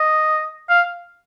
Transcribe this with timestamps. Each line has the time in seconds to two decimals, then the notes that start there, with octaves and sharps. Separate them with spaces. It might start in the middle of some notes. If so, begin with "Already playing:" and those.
Already playing: D#5
0.70 F5